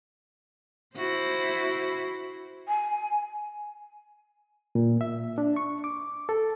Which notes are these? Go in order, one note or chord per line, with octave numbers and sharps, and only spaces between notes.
E4 F#4 C5
G#5
A#2
E5
D4
C#6
D6
A4